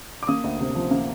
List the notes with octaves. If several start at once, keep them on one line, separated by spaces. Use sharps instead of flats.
D6
A#3 D#6
D2
C3
F3
A#3